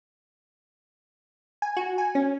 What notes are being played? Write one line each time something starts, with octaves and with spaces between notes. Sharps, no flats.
G#5
F#4
G#5
C#4